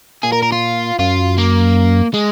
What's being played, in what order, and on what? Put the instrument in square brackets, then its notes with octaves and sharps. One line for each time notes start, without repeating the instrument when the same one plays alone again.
[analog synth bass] A#2 [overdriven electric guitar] G#4
[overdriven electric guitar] A#4
A#4
F4
[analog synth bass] F#2 [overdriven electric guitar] F4
[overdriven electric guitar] A#3
G#3